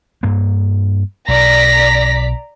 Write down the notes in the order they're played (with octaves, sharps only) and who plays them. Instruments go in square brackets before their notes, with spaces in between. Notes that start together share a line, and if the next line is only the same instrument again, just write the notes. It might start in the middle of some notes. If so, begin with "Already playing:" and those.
[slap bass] G2 A#3
[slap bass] B1 [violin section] D5 A#5 B6 [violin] A#6